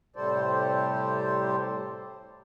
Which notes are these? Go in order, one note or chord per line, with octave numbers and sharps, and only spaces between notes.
A2 C3 G3 A4 C5 D5